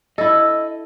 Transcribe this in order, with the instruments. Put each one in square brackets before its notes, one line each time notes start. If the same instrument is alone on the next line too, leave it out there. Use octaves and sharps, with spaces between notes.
[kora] E4 A4 [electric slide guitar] D#5